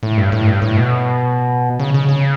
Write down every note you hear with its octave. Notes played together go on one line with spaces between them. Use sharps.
A2
G2
A2
G2
A2
B2
C#3
C#3
C#3